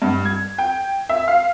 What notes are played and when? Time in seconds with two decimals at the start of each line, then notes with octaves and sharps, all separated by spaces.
0.02 G2
0.25 G#6
0.58 G5
1.09 E5
1.28 F5